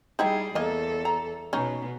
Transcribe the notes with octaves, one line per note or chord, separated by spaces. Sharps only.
G3 D#4 E4 G#4 G5
E2 A#3 A4 D#5
A#5
B2 B3 C#4 D#4